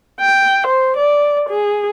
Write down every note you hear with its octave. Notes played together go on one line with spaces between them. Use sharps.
G5
C5
D5
G#4